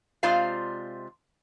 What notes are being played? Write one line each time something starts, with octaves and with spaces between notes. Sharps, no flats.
C3 G#3 F4 C5 D5 F5